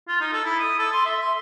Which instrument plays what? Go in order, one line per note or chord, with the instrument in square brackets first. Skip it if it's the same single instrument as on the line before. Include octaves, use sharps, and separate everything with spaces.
[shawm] F4
D#4
A4
E4
D#6
A4
C6
E5
C6